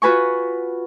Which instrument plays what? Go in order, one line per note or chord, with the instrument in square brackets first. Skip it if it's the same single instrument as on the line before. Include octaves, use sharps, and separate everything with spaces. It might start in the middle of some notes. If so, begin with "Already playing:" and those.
[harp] F4 F#4 B4 G#5 C#6